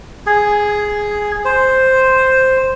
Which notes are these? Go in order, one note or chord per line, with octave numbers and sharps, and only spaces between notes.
G#4
C5